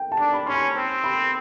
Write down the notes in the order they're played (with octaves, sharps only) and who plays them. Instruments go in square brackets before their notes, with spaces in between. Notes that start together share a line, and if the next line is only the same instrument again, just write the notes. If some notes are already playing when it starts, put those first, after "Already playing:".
Already playing: [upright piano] G5
A5
[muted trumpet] D4
[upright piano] B5
[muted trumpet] C#4 [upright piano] C6
[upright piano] B5
[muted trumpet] C4
[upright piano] B5